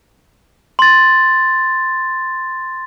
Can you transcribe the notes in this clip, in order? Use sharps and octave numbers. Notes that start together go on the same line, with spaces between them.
C6 A6